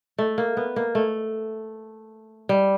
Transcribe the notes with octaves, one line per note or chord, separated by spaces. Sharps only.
A3
A#3
B3
A#3
A3
G3